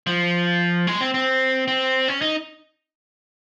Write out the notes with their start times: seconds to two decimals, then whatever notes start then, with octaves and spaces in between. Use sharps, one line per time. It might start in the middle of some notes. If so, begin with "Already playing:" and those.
0.07 F3
0.87 G#3
1.01 C4
1.14 C4
1.68 C4
2.08 C#4
2.21 D#4